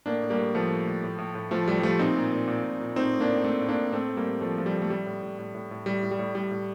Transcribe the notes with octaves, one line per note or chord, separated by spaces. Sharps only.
A2 A#3 D4
A2
G3 A#3
A2
A2 F3 A3
A2
A2
A2
A2
A2
A2 F3 A3
A2 G3
G3
A2 F3 A3
A#2 C4 D#4
A#2
A#2
A#2
A#2
A#2
A2 C4 D#4
A2
A#3 D4
A2
A2 A3 C4
A2
A#3 D4
A2
A2 A3 C4
A2
G3 A#3
A2
A2 F3 A3
A2 F3
G3
A2
A3
A2 G3
A2
A2
A2
A2
A2
A2 G3
A2
G3
A2
A2 G3
A2